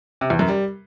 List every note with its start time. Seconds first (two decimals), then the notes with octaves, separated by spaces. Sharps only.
0.21 C3
0.30 E2
0.39 F#2
0.48 G3